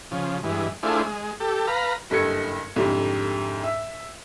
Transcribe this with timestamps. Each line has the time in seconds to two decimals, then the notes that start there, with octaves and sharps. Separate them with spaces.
0.11 C#3 F3
0.43 G2 E3 G#3
0.83 A3 D4 E4 F4 G#4 C5
1.04 G#3
1.40 G4 A4
1.67 B4 F5 A#5
2.10 F#1 G2 A4 D#5 G#6 C#7
2.76 C2 F2 G#2 D3 G3
3.64 E5